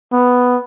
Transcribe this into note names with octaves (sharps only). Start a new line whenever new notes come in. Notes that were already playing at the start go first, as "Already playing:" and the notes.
B3